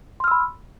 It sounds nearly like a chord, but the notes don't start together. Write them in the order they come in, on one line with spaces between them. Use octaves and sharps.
C6 F6 E6 B5